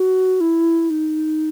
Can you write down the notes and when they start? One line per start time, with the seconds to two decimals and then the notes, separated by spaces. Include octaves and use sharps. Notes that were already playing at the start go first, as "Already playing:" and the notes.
Already playing: F#4
0.41 E4
0.90 D#4